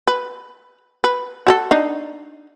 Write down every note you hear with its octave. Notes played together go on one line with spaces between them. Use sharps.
B4
B4
F#4 G#4 A4
D4 D#4